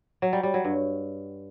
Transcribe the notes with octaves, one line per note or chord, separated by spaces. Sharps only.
F#3
G3
G3
F#3
G2